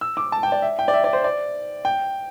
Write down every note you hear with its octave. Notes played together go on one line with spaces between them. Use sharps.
E6
D6
A5
G5
D5
E5
G5
D5
E5
D5
C5
D5
G5